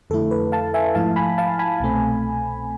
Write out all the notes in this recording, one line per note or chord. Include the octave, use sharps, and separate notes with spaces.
F2 D3 A3 E4 A4
B4
F5 A5
E5 G#5
G#2 F3 A3 E4 F5 A5
G#5 B5
F5 A5
G#5 B5
C2 B2 A3 C4